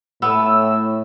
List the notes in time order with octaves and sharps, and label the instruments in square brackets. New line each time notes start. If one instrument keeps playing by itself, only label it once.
[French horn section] A2 [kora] B3 [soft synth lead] E6